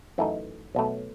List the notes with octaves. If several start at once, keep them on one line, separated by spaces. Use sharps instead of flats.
F#2 E3 A3 D#4
B1 B2 A3